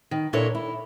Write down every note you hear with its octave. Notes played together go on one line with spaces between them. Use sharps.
D#3
A#2 D4 E4 A4 A#4 C#5
E4